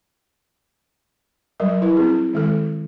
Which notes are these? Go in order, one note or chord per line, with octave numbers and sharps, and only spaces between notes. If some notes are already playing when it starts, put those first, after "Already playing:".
F#3 G3 A#4
E4 B4
C4 G#4
D#3 G#3 A4